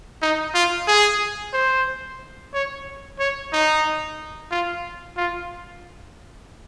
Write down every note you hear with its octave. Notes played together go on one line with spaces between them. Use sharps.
D#4
F4
G#4
C5
C#5
C#5
D#4
F4
F4